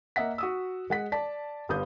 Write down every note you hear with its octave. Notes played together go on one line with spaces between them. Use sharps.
A#3 D#5 E5 F#5 B6
F#4 D#6 E6
G#3 F#5 B6
D5 A5 B6
G1 G2 B3 D#6 G6